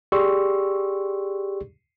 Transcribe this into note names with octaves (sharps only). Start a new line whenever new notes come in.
G4 G#4 D5 C6 C#6 E6